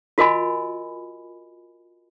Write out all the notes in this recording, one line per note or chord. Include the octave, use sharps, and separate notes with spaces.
F4 F#4 A#4 D#5 G#5 B5